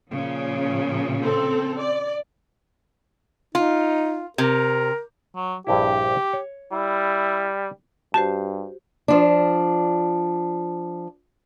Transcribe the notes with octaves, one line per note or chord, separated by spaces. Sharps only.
A#2 C#3 F3
C4 A4
D5
D#4 F4
C3 A#4
F#3
A#1 G2 E4 G4
C#5
G3 E4
G2 F#4 G4 C5 A5
F3 D4